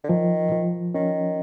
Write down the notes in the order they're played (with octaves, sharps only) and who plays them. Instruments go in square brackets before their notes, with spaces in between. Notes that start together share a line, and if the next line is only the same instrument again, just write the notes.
[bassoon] D3
[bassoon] D#3 [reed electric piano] F3
[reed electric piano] F3
[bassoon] D#3 [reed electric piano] C#4